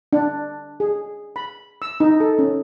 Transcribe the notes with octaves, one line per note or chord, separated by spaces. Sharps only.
D4
G#4
B5
E6
D#4
A4
C#4